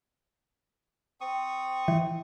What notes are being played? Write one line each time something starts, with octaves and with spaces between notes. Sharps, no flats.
C4 C#6 D#6
E3